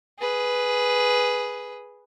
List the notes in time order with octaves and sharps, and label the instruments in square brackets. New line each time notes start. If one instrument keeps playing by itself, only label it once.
[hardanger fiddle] G#4 B4